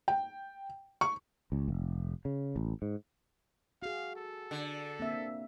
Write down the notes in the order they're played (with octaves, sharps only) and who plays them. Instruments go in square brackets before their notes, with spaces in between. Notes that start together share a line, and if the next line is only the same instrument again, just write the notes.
[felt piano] G5
C#6
[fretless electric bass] C#2
F1
C#3
A1
G#2
[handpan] F#4 G#4 [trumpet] F5
[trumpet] A4
[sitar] D3
[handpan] A#3 C4 E5